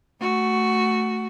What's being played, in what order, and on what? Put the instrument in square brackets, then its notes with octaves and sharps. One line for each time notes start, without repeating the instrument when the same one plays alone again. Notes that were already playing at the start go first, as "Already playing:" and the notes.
[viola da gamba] A3 F#4